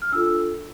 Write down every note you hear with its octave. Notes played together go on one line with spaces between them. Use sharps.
F6
D4 F4 A4 E6